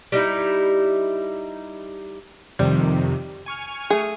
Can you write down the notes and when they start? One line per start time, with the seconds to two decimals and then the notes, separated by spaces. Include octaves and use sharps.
0.12 G3 D#4 E4
2.59 F2 C3 D#3 G3
3.46 G#5 C#6 F6
3.90 A3 G#4